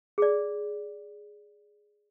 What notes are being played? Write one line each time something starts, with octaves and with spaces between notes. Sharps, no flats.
G#4 D5